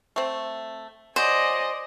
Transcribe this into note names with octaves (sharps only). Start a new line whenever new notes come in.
A3 C4
F#3 C5 D5 D#5 G#5